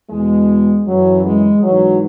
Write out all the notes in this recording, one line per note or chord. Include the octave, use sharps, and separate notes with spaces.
E2 B2 G#3
F#2 E3 F#3
G#3
G#2 E3 F#3